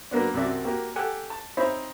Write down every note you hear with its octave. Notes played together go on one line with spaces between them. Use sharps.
F#3 A#3 B3 D4
C2 F#2 C3 F#4 D5 E5
A#3 F#4 G4
G4 A4 F#5 G#5
A5
C4 D#4 C5 C#5 E5 B5